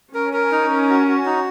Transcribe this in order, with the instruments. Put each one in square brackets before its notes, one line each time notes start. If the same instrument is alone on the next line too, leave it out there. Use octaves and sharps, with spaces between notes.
[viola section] C#4 [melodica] A#4
[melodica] A#4
D#4
A#4
F#4
F#4
D#4